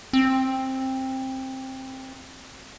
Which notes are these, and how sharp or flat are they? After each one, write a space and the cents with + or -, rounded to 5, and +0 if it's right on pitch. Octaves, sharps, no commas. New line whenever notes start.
C4 +15